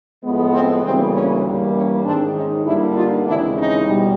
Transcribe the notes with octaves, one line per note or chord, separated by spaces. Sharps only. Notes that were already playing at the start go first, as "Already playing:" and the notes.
A2 F3 G#3 B3
C4
D2 C#3 E3 G3 A#3 C4
C#4
G2 E3 G3 A#3
C#4
G#2 D#3 G#3 C4 D4
C#4 D#4
G2 D3 G3 A#3 D4 E4
D#4 F4
D#2 C#3 E3 G#3 C4 D4 E4
C#4 D#4
E2 B2 G3